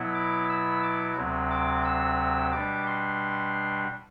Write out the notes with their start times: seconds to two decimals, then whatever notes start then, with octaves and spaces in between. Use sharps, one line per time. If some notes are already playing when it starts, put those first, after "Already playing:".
Already playing: B2 F#3 B3 E4
0.15 D6
0.49 E6
0.83 D6
1.17 D2 C3 F#3 C4
1.51 D6
1.85 E6
2.52 B2 G3 D4 D6
2.87 C6